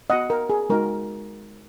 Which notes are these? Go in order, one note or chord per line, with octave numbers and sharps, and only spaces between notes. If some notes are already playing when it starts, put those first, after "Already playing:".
B3 F#4 D#5 F#5
A#4
G#4
G#3 D#4 F#4 A#4